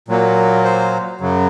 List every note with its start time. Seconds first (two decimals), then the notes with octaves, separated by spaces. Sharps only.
0.08 A#2 F#3 A#3
0.64 C5
1.20 F#2 C#3 F#3